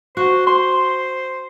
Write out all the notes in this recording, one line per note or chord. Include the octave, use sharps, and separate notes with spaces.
F#4 C5
C5 C6